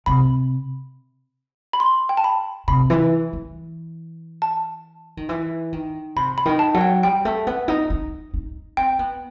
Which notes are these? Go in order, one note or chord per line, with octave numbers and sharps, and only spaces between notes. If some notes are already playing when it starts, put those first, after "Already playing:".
C3 B5
B5
C6
G5
A5
B5
C3 B5
E3
E3
A5
D#3
E3
D#3
C3 B5
B5
D#3
A5
F#3 F#5
G5
G3 G5
A3
B3
D#4
D#4
D#4
C4 G5
B3